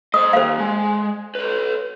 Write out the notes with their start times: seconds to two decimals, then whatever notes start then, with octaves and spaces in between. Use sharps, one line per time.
0.14 C5 D#5 D#6
0.33 D#2 C5 F5
0.59 G#3
1.35 B4 C#5